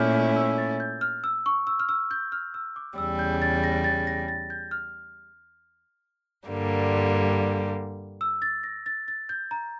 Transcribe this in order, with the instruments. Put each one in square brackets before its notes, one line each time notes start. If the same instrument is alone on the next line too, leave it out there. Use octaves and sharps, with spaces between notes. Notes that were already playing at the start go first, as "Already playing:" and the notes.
Already playing: [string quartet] A#2 A3 C#4 E4 [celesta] D6 F6 G6
[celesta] F6
E6
A6
G6
F6
E6
C#6
E6
F6
E6
G6
F6
E6
D6
[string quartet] E2 C#3 G3 [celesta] E6
[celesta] G6
A6
A#6
A6
A#6
A6
G6
F6
[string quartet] G2 D3 G3 A#3
[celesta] E6
A6
A#6
A6
A6
G6
A#5